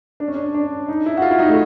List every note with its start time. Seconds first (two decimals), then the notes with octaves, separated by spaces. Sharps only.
0.20 D4
0.28 C#4
0.35 D4
0.54 D4
0.88 D#4
1.06 E4
1.17 F#4
1.22 F4
1.31 E4
1.39 D#4
1.48 A3